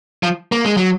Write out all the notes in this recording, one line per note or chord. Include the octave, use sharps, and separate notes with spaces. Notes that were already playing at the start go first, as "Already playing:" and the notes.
F3
A#3
G#3
F#3